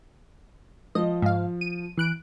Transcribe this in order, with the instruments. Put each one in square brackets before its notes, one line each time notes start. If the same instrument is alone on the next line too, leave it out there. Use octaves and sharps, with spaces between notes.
[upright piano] F3 [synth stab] D#5
[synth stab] G#2 F5
D#7
E3 F#6 D7